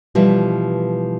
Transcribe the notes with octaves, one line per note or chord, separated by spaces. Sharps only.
B2 E3 F3 G3